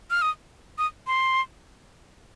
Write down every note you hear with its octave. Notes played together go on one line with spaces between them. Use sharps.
F6
D#6
D#6
C6